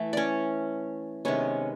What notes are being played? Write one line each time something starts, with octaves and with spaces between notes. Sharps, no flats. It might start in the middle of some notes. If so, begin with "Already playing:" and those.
Already playing: E3 A3
C#4 C#5 D5
C3 D#3 G#3 B3 C#4 C#5